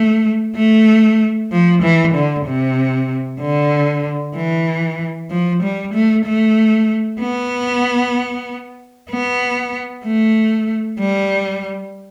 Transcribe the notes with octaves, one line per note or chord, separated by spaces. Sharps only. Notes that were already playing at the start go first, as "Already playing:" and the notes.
Already playing: A3
A3
F3
E3
D3
C3
D3
E3
F3
G3
A3
A3
B3
B3
A3
G3